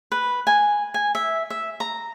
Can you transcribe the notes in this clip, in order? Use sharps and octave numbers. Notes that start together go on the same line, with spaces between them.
B4
G#5
G#5
E5
E5
A#5